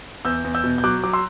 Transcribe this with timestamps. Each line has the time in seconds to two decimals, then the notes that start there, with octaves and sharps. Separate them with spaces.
0.25 E2 E6 G6
0.44 E2
0.55 E6 G6
0.64 B2
0.78 G6
0.84 F#3 D6 F#6
1.03 F#3 D6
1.13 C6 E6